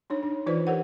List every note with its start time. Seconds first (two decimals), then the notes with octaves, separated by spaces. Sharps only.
0.10 D4 D#4 C#5
0.23 D4
0.46 E3 D#4 F4 B4 C5 D5
0.67 G4 A#4 C5 C#5 F#5